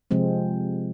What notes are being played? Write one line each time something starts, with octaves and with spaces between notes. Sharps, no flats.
C3 F3 G#3 C4